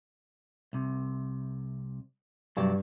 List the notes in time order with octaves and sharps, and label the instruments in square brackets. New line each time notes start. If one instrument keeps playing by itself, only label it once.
[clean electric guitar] C2 C3
[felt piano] G2 [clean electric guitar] C3 F#3 D5